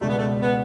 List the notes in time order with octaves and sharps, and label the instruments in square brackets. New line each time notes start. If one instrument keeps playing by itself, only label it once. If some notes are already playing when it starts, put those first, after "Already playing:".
[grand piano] C#2 B2 G#3 D4 [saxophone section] A3
[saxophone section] B3
A3
B3